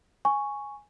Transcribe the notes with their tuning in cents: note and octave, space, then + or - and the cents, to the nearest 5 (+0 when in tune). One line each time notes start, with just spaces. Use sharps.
G#5 +0 C#6 +0